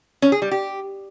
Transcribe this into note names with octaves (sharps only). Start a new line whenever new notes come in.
C#4
G#4
G3
G4